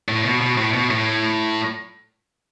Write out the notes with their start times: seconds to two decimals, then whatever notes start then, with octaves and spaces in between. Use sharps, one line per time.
0.08 A2
0.25 B2
0.41 B2
0.58 A2
0.74 B2
0.90 A2